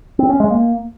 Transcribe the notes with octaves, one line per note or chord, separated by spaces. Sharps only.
C4
C#4
G#3
A#3